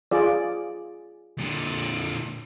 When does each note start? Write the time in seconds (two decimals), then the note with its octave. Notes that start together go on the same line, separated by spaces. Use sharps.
0.11 F4 G#4 D5
1.38 A#2 D3